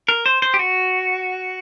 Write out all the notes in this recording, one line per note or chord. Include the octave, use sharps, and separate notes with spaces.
A#4
C5
C5
G4
F#4